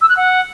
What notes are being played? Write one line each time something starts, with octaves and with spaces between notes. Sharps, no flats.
E6
F#6
F#5